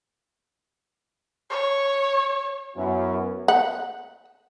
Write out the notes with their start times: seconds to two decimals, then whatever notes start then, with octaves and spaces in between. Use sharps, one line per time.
1.50 C#5
2.76 F#2 B3 C#4 E4 F#4
3.48 F#5